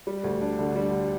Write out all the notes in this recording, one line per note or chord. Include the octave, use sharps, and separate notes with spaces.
G3
D2
D4
D3
G3